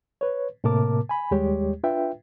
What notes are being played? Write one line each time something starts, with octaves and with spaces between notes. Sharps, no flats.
B4 C#5
A2 C3 A#3 A#4 A5 D6
G#5 B5
D#2 G3 G#3 G4 C#5
D4 F4 B4 E5 G5